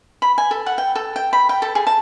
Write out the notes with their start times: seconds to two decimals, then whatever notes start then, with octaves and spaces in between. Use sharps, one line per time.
0.22 B5
0.38 G#5
0.51 A4
0.66 F#5
0.78 G5
0.95 A4
1.16 G5
1.33 B5
1.49 G5
1.62 A4
1.75 G#4
1.87 A5